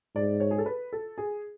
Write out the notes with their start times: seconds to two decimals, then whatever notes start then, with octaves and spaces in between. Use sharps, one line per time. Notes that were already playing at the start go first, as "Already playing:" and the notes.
0.15 G#2 D5
0.40 C#5
0.51 G#4
0.58 A4
0.66 B4
0.93 A4
1.18 G#4